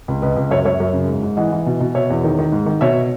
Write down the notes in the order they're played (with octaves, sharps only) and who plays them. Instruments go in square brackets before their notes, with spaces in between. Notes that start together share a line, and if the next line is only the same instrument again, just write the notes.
[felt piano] C#2
C#2 B4 D#5
C#2
F#2 C#5 E5
F#2 C#5 E5
F#2
C#3
G#2
G#2
E3 D#5 F#5
E3
B2
B2
B2 C#5 E5
E2
D#3
D#3
G#2
D#3
B2 C#5 E5